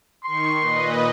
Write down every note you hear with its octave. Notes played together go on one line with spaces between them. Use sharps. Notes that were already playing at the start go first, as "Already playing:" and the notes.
D#3 C6 C#6
A#2 B4 D#5